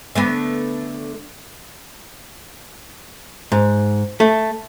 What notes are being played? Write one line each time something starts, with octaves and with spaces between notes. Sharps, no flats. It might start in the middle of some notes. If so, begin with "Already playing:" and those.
D3 A3 B3
G#2
A3